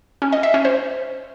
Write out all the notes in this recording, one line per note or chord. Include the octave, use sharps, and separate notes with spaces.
C#4
D#5
E5
C#4
C5